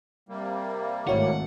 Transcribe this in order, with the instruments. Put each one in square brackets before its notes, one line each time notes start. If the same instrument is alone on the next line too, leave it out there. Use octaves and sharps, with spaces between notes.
[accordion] C3 G3 A#3
[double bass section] G#1 A3 [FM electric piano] E4 F#4 C#5 [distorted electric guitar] F#5